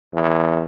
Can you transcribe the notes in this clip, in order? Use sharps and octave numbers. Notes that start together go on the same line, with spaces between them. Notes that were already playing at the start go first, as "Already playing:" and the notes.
E2